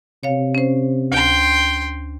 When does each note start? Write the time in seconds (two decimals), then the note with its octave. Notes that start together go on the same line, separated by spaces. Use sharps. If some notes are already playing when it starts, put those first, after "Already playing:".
0.23 C3 C#5 F5
0.55 C#4 C5
1.12 D2 G5 C6